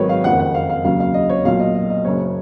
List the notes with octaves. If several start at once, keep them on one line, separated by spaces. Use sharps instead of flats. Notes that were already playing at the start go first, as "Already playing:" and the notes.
Already playing: G#1 G#2 D#3 F#3 A#4 B4 C#5
F5
F#1 F2 D#3 F#5
F#5
F5
F5
D#2 C#3 F#3 F5
F5
D#5
C#5
B1 A#2 F#3 F5
D#5
D#5
D#5
F#1 F#2 C#3 C#5